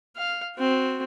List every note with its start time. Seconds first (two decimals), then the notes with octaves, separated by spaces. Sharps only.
0.16 F5
0.57 C4 F#4